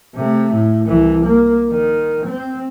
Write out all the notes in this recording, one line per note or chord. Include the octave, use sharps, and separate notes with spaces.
C3 A3
A2
C2 E3
A#3
D#3
C4